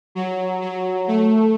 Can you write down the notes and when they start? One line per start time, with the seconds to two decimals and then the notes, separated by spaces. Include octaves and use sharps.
0.15 F#3
0.62 F#3
1.08 A3